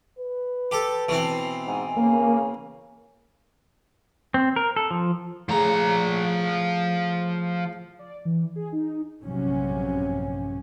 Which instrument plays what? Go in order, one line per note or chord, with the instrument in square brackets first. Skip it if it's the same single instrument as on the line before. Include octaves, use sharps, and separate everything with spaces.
[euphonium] B4
[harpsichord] G4 A4 [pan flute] A5
[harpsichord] B2 E3 C4
[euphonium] G#2 [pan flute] G#5
[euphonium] C#3 [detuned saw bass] A#3
[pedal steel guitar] C4
A#4
A4
F3
[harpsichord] A2 C#3 [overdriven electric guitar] F3 A#5
[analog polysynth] D5
E3
G#4
D#4
[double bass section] A#1 G2 C3 F#3 C#4